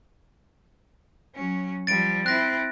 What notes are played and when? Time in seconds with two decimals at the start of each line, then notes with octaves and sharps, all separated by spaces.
1.35 F#3 C#4
1.87 F3 G3 A6 D7
2.26 C4 E4 F#6 A#6